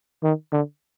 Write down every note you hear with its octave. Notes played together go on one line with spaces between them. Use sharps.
D#3
D3